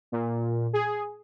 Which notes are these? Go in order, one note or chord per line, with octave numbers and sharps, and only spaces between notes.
A#2
G#4